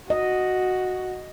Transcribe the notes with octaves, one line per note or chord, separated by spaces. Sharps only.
F#4 D#5